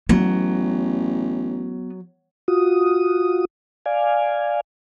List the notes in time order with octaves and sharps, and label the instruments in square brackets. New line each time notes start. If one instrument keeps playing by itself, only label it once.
[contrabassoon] A1 [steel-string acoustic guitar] F#3 [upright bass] B3
[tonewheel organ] F4 F#4 D#6
D5 F5 G#5